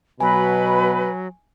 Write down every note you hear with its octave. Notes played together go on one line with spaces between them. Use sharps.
B2 F#3 B4 G#5 B5